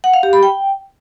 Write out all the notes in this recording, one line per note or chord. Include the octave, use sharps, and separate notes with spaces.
F#5
F5
G4
B5
G5